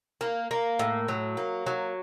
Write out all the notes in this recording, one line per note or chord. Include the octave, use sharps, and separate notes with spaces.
A#3
A#3
A2
F#3
A#3
F#3